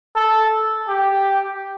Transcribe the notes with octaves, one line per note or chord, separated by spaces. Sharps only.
A4
G4